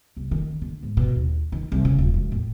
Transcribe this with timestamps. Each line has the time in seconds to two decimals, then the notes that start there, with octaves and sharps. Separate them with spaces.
0.17 C2
0.31 D#3
0.62 D3
0.83 G#2
0.97 B2
1.16 D#2
1.52 D#3
1.72 C2
1.85 C#3
1.98 D#1
2.14 E1
2.32 A2